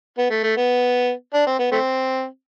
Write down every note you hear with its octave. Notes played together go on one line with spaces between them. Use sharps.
B3
A3
A3
B3
D4
C4
B3
A3 C4